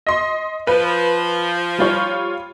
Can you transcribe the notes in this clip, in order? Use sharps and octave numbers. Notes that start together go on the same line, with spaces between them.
D#5 C6
F3 B4
G3 F4 C#5